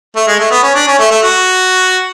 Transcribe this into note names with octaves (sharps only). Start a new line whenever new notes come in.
A3
G#3
A3
B3
C#4
D4
C#4
A3
A3
F#4